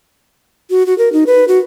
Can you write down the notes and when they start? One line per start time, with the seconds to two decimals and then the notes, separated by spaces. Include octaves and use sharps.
0.70 F#4
0.86 F#4
0.98 A#4
1.13 D#4
1.27 B4
1.48 F#4